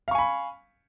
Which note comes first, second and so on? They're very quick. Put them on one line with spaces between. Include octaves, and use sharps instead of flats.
F5 C#6 G#5 B5